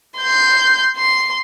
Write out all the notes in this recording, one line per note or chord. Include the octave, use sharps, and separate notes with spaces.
C6 G6
C6